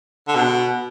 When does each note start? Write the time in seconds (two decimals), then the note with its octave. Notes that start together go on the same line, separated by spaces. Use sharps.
0.28 D3
0.35 B2